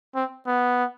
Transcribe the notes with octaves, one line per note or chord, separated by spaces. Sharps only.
C4
B3